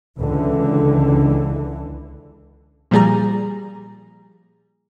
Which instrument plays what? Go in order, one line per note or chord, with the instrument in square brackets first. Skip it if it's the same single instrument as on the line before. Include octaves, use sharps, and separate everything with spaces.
[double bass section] C#2 D3 E3
[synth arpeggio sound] A#2 F3 G3 G#4 A#5